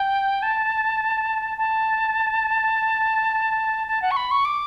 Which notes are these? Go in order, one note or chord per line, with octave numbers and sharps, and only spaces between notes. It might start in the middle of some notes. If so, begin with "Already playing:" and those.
Already playing: G5
A5
A5
A5
F#5
C#6
B5
C#6
D6